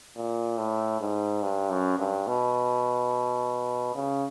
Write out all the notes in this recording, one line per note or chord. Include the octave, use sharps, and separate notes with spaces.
A#2
A2
G#2
G2
F#2
G2
B2
C#3